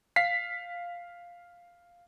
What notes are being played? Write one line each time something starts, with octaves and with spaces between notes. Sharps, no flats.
F5 B6 C7